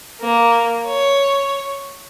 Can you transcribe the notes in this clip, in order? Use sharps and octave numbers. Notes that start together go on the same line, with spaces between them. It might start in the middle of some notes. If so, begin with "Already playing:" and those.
A#3
C#5